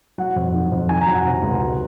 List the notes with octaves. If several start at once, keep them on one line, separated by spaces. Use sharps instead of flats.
F#3 F#5
F2
D#3
F2
D#3 G#5
A#5
F#3
F#5
C3
C#2
F#3